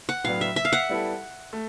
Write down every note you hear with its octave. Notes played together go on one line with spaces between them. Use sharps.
F#5
A2 F#3 B3 D4 F5
E5
E5
F5
F#5
G3 B3 E4 A4
A3